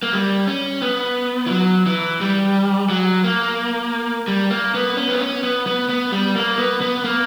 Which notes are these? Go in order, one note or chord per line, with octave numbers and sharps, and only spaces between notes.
A#3
G3
C#4
B3
E3
F#3
E3
G3
F#3
A#3
G3
A#3
B3
C#4
B3
C#4
B3
B3
B3
G3
A#3
B3
B3
A#3